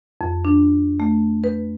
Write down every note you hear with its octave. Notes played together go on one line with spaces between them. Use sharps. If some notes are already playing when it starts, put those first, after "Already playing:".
F2
D4
A3
B4